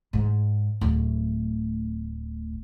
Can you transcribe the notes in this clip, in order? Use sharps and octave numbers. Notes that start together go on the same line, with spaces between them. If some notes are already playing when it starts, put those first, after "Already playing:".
G#2
D1 A3